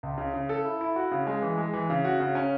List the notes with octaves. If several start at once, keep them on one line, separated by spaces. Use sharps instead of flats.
C#2
C#3
C#3
A4
E4
E4
F#4
C#3
G#3
E3
G#3
E3
C#3
F#4
C#3
C#4